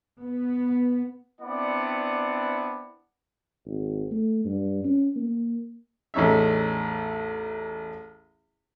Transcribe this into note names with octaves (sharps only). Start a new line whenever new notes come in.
B3
B3 C4 D4 E4 D5 F#5
G#1
A3
G2
C#4
A#3
A1 E2 C#4 D#4 E5